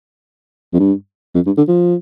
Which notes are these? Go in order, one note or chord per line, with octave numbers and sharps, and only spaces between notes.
F2
G2
F2
G2
D3
F3